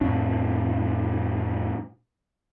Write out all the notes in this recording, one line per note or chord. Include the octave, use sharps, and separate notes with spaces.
F2 A2 D4